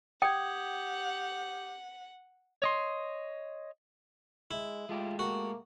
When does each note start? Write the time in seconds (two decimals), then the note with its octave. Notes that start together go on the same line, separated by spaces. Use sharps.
0.22 G4 F#5 G5 D#6 G#6
2.62 C#5 D#5 C6
4.51 G#3 E4
4.89 G#3 A3 F4 G4
5.19 A#3 F#4